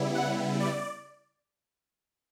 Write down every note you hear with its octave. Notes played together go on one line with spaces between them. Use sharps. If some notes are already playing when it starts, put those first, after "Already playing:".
Already playing: C#3 G3 B3 E4
F#5
D5